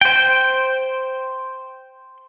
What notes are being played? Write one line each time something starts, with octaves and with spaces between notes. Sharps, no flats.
C5 G5